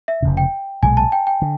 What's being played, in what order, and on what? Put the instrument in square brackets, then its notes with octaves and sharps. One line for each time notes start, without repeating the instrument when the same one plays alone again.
[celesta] E5
[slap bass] F1 F2 C#3
[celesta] G5
[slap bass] B1 A#2 F3 G#3 [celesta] G#5
[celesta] A5
G5
G5
[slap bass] D3